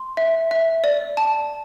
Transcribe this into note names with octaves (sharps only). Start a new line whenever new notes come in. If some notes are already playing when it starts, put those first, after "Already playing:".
Already playing: C6
E5
E5
D5
A5